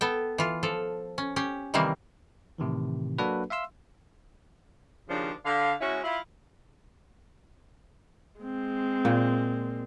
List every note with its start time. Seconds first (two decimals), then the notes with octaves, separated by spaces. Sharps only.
0.01 B3 A4 G5
0.38 E3 F4
0.63 F3 A4
1.18 C#4
1.36 C#4 G4
1.74 C3 D#3 E3 G3 A#3 C4
2.58 A2 C3 D#3 E3
3.18 F#3 A#3 D4 F#4 A4 B4
3.50 E5 F5 C6 E6
5.09 D#2 C#3 F3 D4
5.45 D3 F5
5.81 G#3 C#4 E4 F#4
6.04 E4 F4
8.40 G#3 C4
9.05 A#2